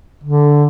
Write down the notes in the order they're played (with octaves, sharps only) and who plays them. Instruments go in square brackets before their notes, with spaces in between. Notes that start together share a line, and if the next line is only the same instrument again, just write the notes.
[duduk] D3